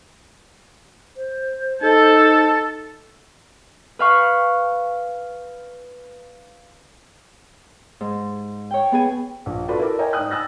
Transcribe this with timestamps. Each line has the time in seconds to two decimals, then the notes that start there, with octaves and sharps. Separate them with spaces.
1.17 C5
1.82 D#4 A4 A5
3.99 B4 F5 C#6
8.01 G#2
8.71 C#5 G5
8.92 B3 G#4 G#5
9.46 A#1
9.68 F4 F#4 A4 B4 D5
9.79 E4 A4 A#4 D6
9.99 A#4 C#5 D#5 G5 G#5 A#5
10.13 G#2 D#4 D5 G5 D#6 F#6
10.31 G#5 D#6 E6 F#6 A6 A#6